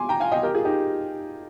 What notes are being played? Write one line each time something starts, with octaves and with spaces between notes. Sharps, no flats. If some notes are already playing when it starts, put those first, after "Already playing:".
Already playing: G#5 C6 D6
G5 A#5
F5 G#5
D#5 G5
G4 A#4
F4 G#4
D#4 G4